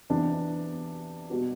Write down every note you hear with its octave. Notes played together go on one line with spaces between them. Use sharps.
C3 E3 B3 D4 G4
B2 G3 B3 F#4